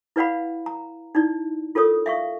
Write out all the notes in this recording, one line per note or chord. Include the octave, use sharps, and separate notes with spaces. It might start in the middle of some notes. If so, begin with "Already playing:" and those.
E4 B4 D5 F5 F#5 B5
A#5
D#4 E4 D5
F4 A4 A#4 C#5 D#6
E5 F5 C#6